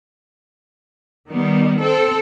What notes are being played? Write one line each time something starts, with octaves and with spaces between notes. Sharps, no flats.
D#3 G3 B3
C4 A4